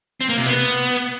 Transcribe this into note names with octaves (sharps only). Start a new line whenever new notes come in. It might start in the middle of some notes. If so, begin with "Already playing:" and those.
C4
A#3
C3
B3